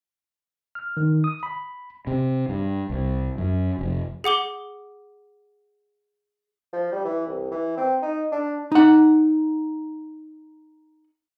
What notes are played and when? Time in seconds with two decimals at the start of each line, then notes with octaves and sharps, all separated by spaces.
0.75 F6
0.97 D#3
1.24 D#6
1.43 B5
2.07 C3
2.49 G2
2.90 C2
3.38 F#2
3.79 F1
4.24 G#4 F#5 D6 G7
6.73 F3
6.91 G3
7.05 E3
7.26 C2
7.51 E3
7.77 C4
8.02 D#4
8.32 D4
8.72 D#4 F#5